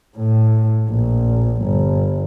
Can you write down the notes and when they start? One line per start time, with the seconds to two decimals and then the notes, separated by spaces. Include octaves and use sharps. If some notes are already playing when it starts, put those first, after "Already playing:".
0.18 A2
0.90 A#1
1.63 G1